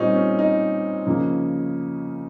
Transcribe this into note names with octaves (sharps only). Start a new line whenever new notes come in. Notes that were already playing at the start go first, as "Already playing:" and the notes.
Already playing: A#2 G3 C4 C#4 D#4
C#4
D#4
C#3 F3 A#3